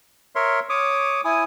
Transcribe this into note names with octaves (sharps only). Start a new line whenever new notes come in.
A#4 C#5 E5 C6
C#5 D6 D#6
E4 G#5 D#6